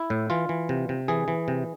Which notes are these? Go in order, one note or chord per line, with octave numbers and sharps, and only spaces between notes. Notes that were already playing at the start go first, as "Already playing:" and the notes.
Already playing: E4
A2
E3 F4
E3
C3
C3
E3 G#4
E3
C3